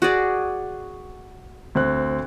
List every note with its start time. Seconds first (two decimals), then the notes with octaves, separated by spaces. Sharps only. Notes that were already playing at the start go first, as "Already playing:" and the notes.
0.02 F#4 G#4 D5
1.75 D2 C4 F#6